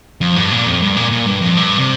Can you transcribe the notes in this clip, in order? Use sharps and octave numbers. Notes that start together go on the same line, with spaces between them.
F2
G2
A#2
F2
G2
A#2
A#2
G2
F2
G2
C3